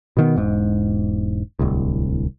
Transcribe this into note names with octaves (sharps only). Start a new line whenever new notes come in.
B2 D#3 B3
E1 G#2
D1 C2